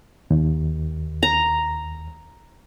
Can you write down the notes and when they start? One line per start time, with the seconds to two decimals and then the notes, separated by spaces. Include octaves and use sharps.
0.31 D#2
1.23 A#5